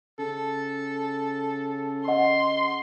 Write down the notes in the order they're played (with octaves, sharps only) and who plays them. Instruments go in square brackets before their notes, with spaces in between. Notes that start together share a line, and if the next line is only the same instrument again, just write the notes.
[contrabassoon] C#3 [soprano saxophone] A4
[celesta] D#5 F#5 [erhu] C6